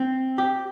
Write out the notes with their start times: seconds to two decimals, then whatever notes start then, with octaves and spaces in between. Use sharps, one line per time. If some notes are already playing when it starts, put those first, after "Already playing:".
Already playing: C4
0.38 G4